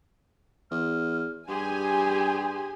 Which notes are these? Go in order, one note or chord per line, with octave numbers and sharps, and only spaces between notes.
E2 F6
G2 G4 G#4 G#5 C6